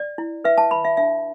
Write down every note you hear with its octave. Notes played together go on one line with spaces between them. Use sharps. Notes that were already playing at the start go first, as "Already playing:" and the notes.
Already playing: D5
E4
B4 E5
A5
B4 B5
E5
D4 E5